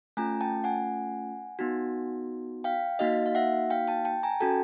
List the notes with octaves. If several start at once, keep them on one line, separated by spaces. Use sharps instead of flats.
A3 C#4 F4 G#5 A#5
G5 A5
F#5 G#5
B3 D#4 F#4
F5 G5
A#3 D#4 F#4 D#5 F5
F5
E5 F#5
F5 G5
G5 A5
G5 A5
G#5 A#5
C#4 F#4 A4 G5 A5